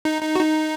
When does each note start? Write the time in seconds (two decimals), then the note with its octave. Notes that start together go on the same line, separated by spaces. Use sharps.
0.05 D#4
0.22 D#4
0.35 F#4
0.40 D#4